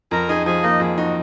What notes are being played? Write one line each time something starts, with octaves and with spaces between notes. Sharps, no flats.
F2 A#4 A#5
D#4 G#4 G#5
F3 G#4 G#5
A#3 D#4 D#5
F2 G#4
D#4 F#4